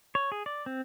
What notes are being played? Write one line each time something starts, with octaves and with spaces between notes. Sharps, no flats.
C#5
G#4
D5
C4